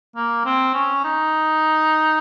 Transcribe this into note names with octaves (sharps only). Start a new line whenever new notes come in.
A#3
C4
C#4
D#4